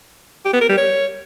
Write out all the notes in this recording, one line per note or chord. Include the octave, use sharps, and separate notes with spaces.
G4
B3
A#4
G3
C#5